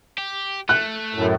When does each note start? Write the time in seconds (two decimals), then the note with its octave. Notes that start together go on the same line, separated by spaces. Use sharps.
0.18 G4
0.69 A3 F#6
1.14 F#2 A2